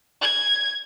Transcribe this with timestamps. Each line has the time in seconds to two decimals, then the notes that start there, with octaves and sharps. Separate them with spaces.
0.22 G#6